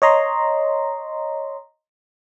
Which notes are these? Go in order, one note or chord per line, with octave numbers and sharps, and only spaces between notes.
C#5 D#5 A#5 C6